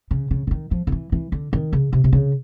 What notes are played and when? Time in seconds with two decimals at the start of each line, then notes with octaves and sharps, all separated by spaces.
0.11 C#3
0.31 C#3
0.47 D3
0.51 D#3
0.71 F3
0.87 D#3
0.92 E3
1.12 E3
1.32 D3
1.53 D#3
1.73 C#3
1.93 C3
2.04 C3
2.13 C#3